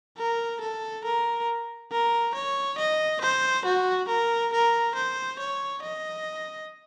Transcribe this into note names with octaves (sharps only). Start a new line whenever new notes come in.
A#4
A4
A#4
A#4
C#5
D#5
C5
F#4
A#4
A#4
C5
C#5
D#5